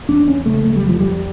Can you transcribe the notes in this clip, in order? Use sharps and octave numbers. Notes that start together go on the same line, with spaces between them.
E2 D4
C#4
C#3 A3
A3
G3
F2
F3
G3